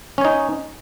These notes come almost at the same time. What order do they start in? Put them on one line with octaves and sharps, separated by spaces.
C#4 C#5 D#4